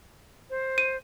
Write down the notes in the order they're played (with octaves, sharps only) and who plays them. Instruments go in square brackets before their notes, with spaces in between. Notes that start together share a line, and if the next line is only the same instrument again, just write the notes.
[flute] C5
[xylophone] D#7